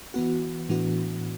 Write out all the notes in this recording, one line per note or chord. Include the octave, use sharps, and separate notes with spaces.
E3 B3 F#4
A2 E3 B3 D4 F#4